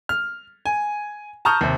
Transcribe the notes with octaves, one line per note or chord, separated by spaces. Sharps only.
F6
G#5
A5 A#5 C#6 D#6 F6 G6
D#2 C3